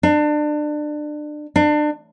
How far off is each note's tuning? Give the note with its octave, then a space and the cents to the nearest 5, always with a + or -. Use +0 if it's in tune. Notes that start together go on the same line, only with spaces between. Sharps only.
D4 +30
D4 +30